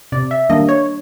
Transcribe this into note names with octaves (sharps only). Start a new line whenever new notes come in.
C3 D5
E5
D#3 G3 A#3 D4 D#5
C#5